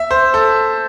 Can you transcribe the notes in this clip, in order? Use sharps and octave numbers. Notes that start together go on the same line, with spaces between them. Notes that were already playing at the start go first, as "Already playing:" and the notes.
Already playing: E5
C5
A4